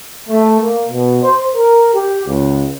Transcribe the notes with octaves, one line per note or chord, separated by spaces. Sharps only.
A3
A#3
B2
C5
A#4
G4
C#2